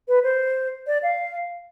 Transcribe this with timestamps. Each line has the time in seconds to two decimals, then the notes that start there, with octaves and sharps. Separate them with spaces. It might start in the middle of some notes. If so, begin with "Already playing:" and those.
0.08 B4
0.23 C5
0.87 D5
1.03 F5